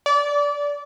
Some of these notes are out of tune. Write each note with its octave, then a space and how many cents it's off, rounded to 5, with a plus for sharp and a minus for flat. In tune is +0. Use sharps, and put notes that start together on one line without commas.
D5 -25